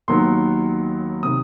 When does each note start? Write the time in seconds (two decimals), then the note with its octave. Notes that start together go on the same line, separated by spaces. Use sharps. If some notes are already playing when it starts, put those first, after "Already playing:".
0.08 D#2 D#3 F#3 B3 C6
1.23 C3 D#3 D#6